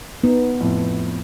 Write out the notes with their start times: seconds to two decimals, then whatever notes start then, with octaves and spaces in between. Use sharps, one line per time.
0.24 B3 D#4
0.61 F2 A2